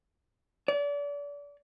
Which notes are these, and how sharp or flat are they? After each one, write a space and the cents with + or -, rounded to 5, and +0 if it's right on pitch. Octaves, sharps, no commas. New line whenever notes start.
D5 -35